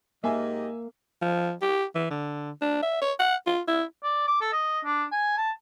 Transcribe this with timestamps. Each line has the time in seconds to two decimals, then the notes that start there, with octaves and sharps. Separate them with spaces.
0.24 G#2 A#3 G4 D#5 E5 G#5
1.22 F3
1.62 G4
1.95 E3
2.10 D3
2.62 D4
2.83 E5
3.02 C#5
3.20 F#5
3.46 F4
3.68 E4
4.03 D5
4.27 D6
4.41 A4
4.53 D#5
4.85 D4
5.12 G#5
5.37 A5